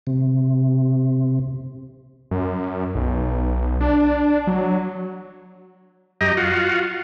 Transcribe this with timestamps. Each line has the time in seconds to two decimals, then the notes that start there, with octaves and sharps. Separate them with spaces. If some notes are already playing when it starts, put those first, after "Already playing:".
0.07 C3
2.31 F#2
2.95 B1
3.81 D4
4.47 F#3
6.21 F#2 G4 D#5 A#5
6.37 F4 F#4